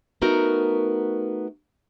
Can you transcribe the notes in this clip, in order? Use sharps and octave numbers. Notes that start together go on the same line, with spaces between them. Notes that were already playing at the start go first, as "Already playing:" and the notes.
A3 B3 D#4 F#4 A#4